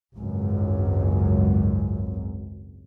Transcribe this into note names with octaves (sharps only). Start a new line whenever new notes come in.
G#1 C#2 F#2